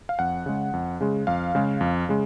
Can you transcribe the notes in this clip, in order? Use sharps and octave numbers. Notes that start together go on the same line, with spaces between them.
F5
F2 F#5
C#3 G#3
F2
C#3 G#3
F2 F5
C#3 G#3
F2
C#3 G#3